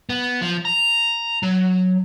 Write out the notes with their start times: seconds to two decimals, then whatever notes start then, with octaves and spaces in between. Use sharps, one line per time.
0.09 B3
0.41 F3
0.65 A#5
1.43 F#3